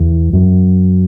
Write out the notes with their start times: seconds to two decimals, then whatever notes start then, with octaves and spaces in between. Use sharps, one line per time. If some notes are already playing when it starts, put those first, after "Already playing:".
Already playing: E2
0.33 F#2